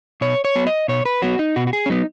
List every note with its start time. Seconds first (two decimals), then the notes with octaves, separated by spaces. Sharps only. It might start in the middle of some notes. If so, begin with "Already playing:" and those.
0.21 B2 C#5
0.45 C#5
0.56 F#3 B3
0.67 D#5
0.88 B2 C#5
1.05 B4
1.22 F#3 B3 F#4
1.39 D#4
1.56 B2 F#4
1.67 F#4
1.73 G#4
1.86 C#4
1.90 F#3 B3 D#4